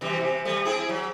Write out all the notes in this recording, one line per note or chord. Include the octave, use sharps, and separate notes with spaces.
B2 E3 G3
C3
G3 A3
C4 E4 G#4
F#3